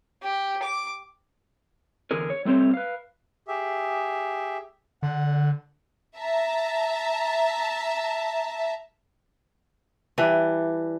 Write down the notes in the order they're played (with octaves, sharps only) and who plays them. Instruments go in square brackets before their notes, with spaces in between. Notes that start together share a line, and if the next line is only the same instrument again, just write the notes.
[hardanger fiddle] G4
D6
[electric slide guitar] E2 D3 G#4 A#4
C#5
G3 A3 C4 C5 C#5
B4 F5
[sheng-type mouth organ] G4 G#4 E5
[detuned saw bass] D3 [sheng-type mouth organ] F#5
[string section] E5 A5 A#5
[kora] E3 G3 D4